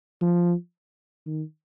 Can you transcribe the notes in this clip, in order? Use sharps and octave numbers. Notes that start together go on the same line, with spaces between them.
F3
D#3